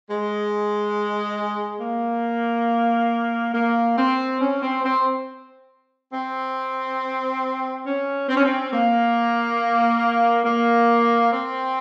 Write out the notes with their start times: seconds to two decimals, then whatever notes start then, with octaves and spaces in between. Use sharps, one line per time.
0.09 G#3
1.81 A#3
3.54 A#3
3.97 C4
4.41 C#4
4.62 C4
4.83 C4
6.13 C4
7.86 C#4
8.29 C4
8.36 C#4
8.45 C4
8.72 A#3
10.45 A#3
11.31 C4